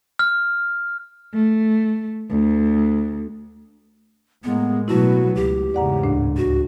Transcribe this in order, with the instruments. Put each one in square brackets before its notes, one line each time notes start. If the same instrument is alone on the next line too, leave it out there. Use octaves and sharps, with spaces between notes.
[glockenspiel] F6
[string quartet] A3
D2
[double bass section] A2 G#3 A#3 [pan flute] B3
[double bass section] B2 F#3 B3 [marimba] A3 E4 [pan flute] F#4
[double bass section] C#2 [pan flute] G4
[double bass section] E2 G#2 C#3 [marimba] D5 F#5 A#5
[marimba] D2 A2 D4
[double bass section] C#2 [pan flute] F#4